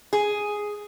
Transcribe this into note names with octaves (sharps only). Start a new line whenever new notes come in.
G#4